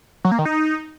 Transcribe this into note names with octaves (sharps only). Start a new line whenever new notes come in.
F#3
A#3
D#3
D#4